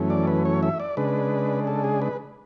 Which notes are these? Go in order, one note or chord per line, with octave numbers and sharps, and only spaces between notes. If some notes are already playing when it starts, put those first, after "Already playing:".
Already playing: F#2 E3 A3 C#4
D5
B4
C#5
E5
D5
C#3 G#3 D4 B4
A4
G#4
B4